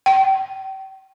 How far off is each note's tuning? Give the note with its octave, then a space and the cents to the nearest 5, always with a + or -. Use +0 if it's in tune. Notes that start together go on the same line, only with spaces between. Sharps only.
G5 -35